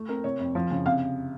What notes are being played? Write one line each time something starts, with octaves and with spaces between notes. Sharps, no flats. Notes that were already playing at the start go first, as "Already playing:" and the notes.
Already playing: A3
C4 A#4
C3 C#5
F2
F3
C#3
C3 F5